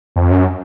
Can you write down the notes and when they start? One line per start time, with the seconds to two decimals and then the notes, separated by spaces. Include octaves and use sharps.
0.16 F2
0.31 F#2